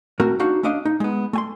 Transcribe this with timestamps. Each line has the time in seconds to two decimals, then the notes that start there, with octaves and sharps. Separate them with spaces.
0.20 A3 C4 F#4 A#4
0.39 D4 D#4 F#4 F5
0.63 A3 C#4 D4 D#5 F5
0.85 D#4
1.00 G#3 B3
1.33 A3 G#5 C6